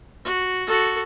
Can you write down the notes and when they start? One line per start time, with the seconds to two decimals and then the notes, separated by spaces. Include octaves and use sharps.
0.25 F#4
0.67 F#4 A4